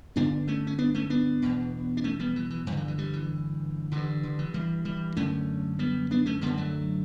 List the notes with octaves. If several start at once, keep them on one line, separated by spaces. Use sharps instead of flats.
G2 D3 B3 D4
A3 C#4
C#4
B3 D4
A3 C#4
B3 D4
E2 B2
D4
A3 C#4
G3 B3
E3
E3
G2 D3 E3 F#3
E3
E3
E3 G3
E3
G2 D3 E3
D3
E3
E3 G3
E3 G3
F#2 D3 A3 C#4
G3 B3
B3 D4
A3 C#4
F#2 D3 G3 B3
F#3 A3